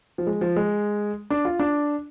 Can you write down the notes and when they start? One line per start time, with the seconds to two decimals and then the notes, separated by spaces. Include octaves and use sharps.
0.18 F3
0.27 G#3
0.41 F3
0.56 G#3
1.30 D4
1.45 F4
1.59 D4